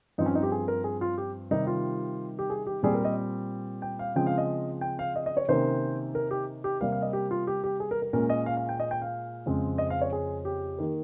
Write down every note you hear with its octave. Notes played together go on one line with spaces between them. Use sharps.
G2 F3 C4 D#4
C#4
D#4
G4
G#4
A#4
G#4
F4
G4
C3 D#3 G3 D#4
F4
G4
G#4
G4
A#2 G3 C4 G#4
A#4
D#5
G5
F5
C#3 F3 G#3 C4 G5
F5
D#5
G5
F5
D#5
D#5
C#5
C3 D#3 A#3 C#4 C5
A#4
G4
G4
C3 G3 A#3 F5
F5
D#5
G4
F4
G4
G4
G#4
A#4
A#4
A#2 G#3 C#4 A#4
D#5
F5
F5
G5
D#5
G5
F5
F2 C#3 G#3 C4
D#5
F5
C#5
G#4
G4
D#3 A#3